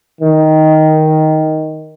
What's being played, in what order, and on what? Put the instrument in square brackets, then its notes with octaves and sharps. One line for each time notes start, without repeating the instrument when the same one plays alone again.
[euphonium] D#3